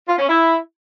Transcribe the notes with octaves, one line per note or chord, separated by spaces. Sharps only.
F4
C#4
E4